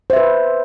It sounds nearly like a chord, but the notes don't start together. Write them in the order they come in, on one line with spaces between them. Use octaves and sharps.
C5 E5 B4